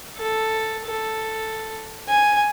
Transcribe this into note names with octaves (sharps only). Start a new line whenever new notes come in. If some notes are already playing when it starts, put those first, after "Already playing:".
A4
A4
G#5